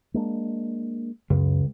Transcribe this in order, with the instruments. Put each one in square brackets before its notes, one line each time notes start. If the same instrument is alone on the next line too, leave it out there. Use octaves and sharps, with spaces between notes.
[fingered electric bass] G#3 A#3 D4
[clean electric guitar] C#2 [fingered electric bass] F#2